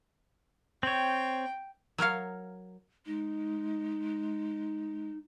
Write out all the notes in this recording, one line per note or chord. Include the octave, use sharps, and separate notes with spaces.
C4 C#5 G5
F#3 A#4 C#5 F5
G#3 D#4